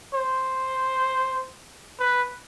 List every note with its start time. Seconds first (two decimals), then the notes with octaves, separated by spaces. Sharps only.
0.14 C5
2.00 B4